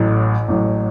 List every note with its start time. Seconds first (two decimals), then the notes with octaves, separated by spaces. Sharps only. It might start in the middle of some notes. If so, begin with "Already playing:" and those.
Already playing: A1 A2 F#3
0.48 A1 A2 F#3